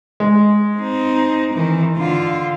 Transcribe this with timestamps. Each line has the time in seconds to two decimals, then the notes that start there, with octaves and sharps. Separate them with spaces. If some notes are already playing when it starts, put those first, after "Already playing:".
0.20 G#3
0.77 C4 D#4
1.53 D#3 E3
1.97 D3 F4